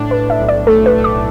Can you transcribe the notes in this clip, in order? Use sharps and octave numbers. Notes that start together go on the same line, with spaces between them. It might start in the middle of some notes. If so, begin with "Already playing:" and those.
Already playing: A2 D4
D4 B4
E5
B1
D5
A3 A4
B4
A3
D6